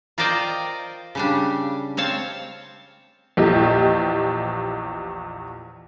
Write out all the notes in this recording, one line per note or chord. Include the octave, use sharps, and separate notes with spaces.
F4 A#4 C5 D5 D#5 G5
C#3 G3 D4
C4 C#5 F5 A5
A#1 E2 G4 D#5